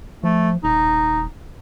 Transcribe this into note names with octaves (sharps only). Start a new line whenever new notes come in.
F3 A3
D#1 D#4